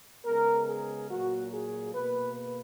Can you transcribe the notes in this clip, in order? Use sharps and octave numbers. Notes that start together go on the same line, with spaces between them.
C#3 G#3 B3 A#4
G#4
A#2 F#3 A#3 F#4
G#4
B2 A#3 B4